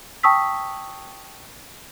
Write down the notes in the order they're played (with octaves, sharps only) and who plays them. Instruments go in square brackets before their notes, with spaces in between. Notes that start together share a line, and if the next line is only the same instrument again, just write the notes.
[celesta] G5 A5 C#6 D#6 E6 B6